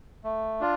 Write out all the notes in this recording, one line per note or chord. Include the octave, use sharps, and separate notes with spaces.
A3
D4 F4